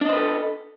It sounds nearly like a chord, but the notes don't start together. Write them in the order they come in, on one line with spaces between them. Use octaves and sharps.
D4 D#5 C5 B4 A4